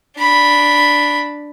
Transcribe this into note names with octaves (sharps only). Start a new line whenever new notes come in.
D4 B5